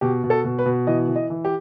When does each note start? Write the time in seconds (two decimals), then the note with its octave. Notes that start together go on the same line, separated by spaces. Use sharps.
0.01 B2 G4
0.24 B2
0.30 A4
0.44 B2
0.59 B4
0.66 B2
0.87 E3 D#5
1.08 E3
1.16 D#5
1.30 E3
1.45 G4